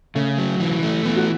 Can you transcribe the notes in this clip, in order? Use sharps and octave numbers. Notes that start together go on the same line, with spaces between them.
C#3 A3
F#3
E3
A3
E3 B3
F#4